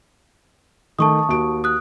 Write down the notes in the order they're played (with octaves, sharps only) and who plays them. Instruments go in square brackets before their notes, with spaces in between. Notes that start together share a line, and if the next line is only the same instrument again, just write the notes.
[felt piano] D#3 A3 [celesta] A5 C#6 D#6
[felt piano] D#2 F#4 D7
[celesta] D#6 F#6